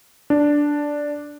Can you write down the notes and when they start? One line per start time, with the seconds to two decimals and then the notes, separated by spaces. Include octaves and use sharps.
0.30 D4